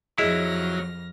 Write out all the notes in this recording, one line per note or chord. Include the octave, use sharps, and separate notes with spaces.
F2 F#3 E4 G#4 D#5 F6 A#6